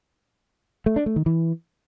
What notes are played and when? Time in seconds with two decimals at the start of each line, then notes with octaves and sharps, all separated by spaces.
0.86 A3
0.96 D4
1.06 A3
1.16 D#3
1.26 E3